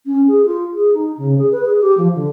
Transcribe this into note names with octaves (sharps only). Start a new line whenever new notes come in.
C#4
G#4
F4
G#4
D#4
C#3
G#4
B4
G#4
G4
F3
D3